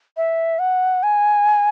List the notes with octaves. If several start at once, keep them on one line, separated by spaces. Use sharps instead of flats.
E5
F#5
G#5